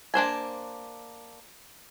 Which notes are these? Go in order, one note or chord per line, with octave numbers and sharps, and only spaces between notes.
A#3 D4 C5 G#5